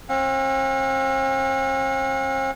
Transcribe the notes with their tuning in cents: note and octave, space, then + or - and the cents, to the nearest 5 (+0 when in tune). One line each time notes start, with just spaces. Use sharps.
C4 +45 F#5 -45